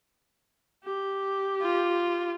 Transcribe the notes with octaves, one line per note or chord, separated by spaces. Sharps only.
G4
F4